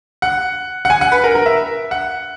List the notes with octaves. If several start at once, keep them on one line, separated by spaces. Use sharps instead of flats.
F#5
F#5
G#5
F#5
B4
A#4
A#4
E5
F#5